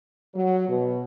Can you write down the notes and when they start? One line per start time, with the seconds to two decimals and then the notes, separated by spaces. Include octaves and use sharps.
0.35 F#3
0.68 B2